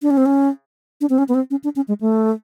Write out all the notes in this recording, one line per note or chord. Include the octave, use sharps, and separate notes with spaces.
D4
C#4
C4
C#4
D4
C4
C#4
B3
C4
C#4
D4
C#4
G#3
A3